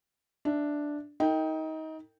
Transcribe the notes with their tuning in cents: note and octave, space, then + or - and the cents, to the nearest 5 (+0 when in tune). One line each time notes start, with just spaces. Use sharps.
D4 +0 E5 +0
D#4 +25 A#4 -45 G5 +0